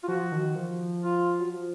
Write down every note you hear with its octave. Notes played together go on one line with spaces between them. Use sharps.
F4
F3 F#4
D#3
F3
F4
F#3
F3